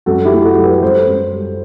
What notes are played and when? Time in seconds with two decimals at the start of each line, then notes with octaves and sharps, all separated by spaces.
0.06 F#2 F#4 A4
0.25 E4 G4
0.32 A3
0.44 F#4 A4
0.57 F#3
0.63 G4 B4
0.82 F#2 A4 C5
1.07 F#2
1.33 G3